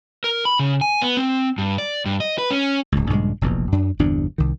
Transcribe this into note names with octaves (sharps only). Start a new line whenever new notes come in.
A#4
B5
C#3
G#5
B3
C4
G2
D5
G2
D#5
B4
C#4
D1 C#2
A#1 G2 C#3 G#3
F1 A#1 E2 B2
F#2 D4
G1 E2 C3 D4
C2 D#3